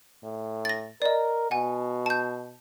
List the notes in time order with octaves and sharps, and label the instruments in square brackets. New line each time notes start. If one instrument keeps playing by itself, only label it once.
[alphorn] A2
[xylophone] A6 A#6
[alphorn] A#4 [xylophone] D5 D#5
[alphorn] B2 [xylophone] F#5 G#5
[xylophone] A5 G6